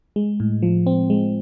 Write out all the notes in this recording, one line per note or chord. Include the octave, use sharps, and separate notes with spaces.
G#3
A2
F3
C4
G#3